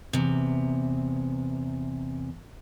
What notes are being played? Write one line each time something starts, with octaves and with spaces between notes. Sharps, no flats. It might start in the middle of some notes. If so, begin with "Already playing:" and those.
E2 C3